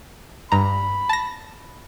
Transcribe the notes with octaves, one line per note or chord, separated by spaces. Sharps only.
G2 A#5 B5
A5 A#6